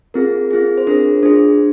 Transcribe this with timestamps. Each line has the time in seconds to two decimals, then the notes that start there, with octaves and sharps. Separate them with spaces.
0.14 C4 F4 G#4 A#4
0.51 C4 F4 G#4
0.78 C5
0.87 D4 F4 G#4 A#4
1.23 D4 F4 G#4 C5